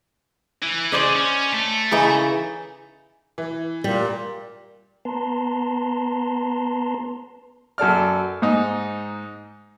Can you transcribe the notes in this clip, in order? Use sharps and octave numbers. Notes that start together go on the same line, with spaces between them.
E3
C#4 G#4 C5 D5 D#5
C#4
A3
C#3 E3 D#4
E3
A#2 G3
B3 B4 A5 A#5 C6
F#2 A4 D5 F6
G#2 D#4